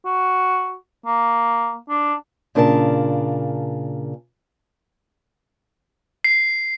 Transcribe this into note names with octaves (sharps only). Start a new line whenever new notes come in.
F#4
A#3
D4
A#2 C#3 D4 A#4 B4 A5
C7